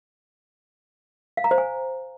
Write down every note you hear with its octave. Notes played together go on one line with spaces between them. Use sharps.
F5
A#5
C5
G#5